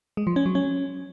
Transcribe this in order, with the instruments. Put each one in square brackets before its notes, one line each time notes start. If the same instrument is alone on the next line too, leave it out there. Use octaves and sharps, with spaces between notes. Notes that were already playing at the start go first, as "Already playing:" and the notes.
[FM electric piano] G#3
F3
C#4
F#3
C#4